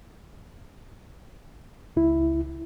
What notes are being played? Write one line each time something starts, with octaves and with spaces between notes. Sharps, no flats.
C#2 E4